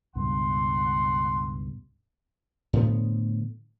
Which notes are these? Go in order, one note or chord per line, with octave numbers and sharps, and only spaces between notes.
C#2 G2 B2 F#5 C6
A2 D3 F3 B3